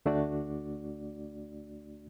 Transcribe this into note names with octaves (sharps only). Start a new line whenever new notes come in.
D2 A3 D4 F#4 D5